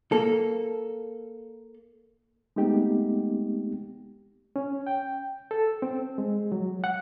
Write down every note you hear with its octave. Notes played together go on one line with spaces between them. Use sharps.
A#3 A4
G#3 A3 B3 C4 D#4 G4
C#4
G5
A4
C4
G#3
F#3
F#5